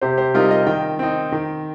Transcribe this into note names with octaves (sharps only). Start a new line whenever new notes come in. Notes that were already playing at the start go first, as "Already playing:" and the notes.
C3 G4 C5
G4 C5
G3 C4 D#4 F4 A#4
A#4 D#5
D#3 D#5 G5
C4 D#4
D#3